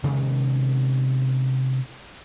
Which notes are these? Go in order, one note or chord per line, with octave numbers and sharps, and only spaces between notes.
C3 D#3 G#3 C#4